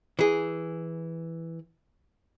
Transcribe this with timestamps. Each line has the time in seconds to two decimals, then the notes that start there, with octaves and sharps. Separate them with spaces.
0.19 E3 G#4